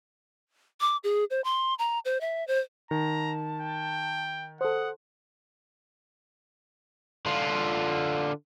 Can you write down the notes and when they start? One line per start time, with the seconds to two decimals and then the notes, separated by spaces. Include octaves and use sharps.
0.80 D6
1.04 G#4
1.30 C5
1.44 C6
1.79 A#5
2.05 C5
2.21 E5
2.48 C5
2.91 D#3 A5 A#5
3.61 G5
4.61 A4 C5 F#5 D#6
7.26 D3 F4